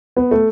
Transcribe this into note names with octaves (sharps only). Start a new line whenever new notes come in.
B3
A3